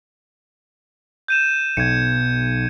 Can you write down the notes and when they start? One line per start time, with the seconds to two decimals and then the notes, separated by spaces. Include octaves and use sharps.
1.28 G6 D#7 E7
1.77 B1 G#6 C#7